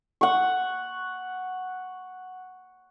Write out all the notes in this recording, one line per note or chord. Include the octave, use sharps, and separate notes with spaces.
F#5 C#6